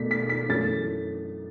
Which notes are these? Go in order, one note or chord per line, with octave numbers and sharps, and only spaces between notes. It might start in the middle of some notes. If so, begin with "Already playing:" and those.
Already playing: B2 A3 B6
B6
B6
F#2 E3 A3 A6